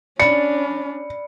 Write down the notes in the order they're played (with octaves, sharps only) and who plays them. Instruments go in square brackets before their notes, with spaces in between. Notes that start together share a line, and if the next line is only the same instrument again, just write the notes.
[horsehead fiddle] C#4 D4 [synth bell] D5 B5 [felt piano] C#7